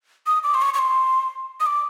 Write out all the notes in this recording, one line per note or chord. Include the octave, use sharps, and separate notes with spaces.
D#6
D6
C6
C#6
C#6
C6
D#6
D6